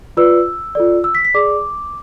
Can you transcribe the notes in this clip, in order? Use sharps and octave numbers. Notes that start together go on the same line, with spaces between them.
F4 B4 D5 E6
F4 A4 D5
E6
B6
B6
G#4 D5 D6